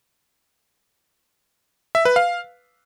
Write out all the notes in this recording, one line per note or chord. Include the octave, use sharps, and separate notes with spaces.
E5
B4
F5